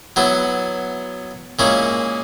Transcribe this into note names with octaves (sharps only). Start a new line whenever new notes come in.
F#3 B3 E4
A#2 G#3 C#4 E4